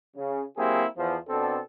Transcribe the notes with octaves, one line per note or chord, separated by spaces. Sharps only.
C#3
F#3 A#3 C4 E4 G4 G#4
E2 F3
B2 C4 D4 A4